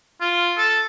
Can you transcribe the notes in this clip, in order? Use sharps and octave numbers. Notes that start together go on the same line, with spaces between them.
F4
A4